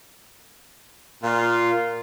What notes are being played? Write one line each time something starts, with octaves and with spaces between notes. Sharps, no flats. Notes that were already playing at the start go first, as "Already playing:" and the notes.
A#2 F4